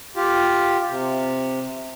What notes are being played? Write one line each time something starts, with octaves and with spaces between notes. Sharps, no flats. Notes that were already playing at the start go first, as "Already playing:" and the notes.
F4 G4
C3